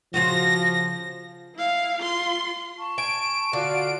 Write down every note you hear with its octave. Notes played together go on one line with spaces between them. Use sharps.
C#3 F3 F4 F#4 A#6
E4 F5
F4 C6
A5 C#6
G#5 D7
D3 F4 F#4 F5